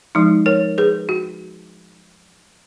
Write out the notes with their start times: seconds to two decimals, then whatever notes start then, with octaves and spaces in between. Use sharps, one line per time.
0.15 F3 G#3 D#4
0.46 A#4 C#5
0.78 G#4 B4
1.09 F#4